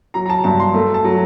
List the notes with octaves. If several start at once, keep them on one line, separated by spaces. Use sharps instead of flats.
F#3 A#5
A#5
A5
G2 A5
C6
A3
A5
F#3